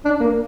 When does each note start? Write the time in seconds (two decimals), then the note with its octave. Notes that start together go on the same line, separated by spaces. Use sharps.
0.05 D4
0.20 A#3